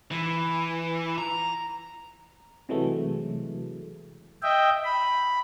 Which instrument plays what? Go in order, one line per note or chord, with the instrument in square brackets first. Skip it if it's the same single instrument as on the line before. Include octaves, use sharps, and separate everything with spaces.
[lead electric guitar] E3
A#5
[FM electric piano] C3 E3 F#3 G#3 A3
[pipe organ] D#5 E5 G5
B5